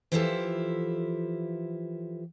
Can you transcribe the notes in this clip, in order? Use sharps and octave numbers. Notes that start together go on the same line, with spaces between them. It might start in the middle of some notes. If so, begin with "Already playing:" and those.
E3 F3 E4 F4 G4 A4